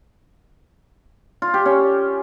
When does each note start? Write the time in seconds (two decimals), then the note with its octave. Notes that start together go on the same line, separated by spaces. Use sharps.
1.42 F4
1.54 G4
1.66 C#4